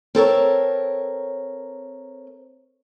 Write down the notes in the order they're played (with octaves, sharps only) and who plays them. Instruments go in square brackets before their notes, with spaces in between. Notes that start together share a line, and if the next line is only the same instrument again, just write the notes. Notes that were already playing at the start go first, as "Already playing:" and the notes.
[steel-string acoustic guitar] C4 A4 A#4 C#5